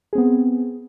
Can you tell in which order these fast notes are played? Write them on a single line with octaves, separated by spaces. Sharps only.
G#4 C4 B3